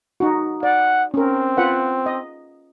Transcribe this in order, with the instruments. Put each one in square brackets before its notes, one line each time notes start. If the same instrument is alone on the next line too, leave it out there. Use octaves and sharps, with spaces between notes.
[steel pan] D#4 F#4
[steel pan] D5 [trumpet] F#5
[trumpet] C4 [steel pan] C#4 A#4
[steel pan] F4 B4 F#5
D#5